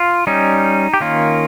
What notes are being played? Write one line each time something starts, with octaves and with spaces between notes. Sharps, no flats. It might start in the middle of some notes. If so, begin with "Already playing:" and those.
Already playing: F4
G3 C#4 D#4
G4
D#3 A#3 C#4 F4